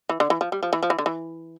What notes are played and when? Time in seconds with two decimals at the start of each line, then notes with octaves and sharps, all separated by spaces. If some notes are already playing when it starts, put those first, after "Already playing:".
0.09 E3
0.20 D3
0.30 E3
0.41 F3
0.52 G3
0.63 F3
0.73 E3
0.83 F3
0.90 E3
0.99 D3
1.06 E3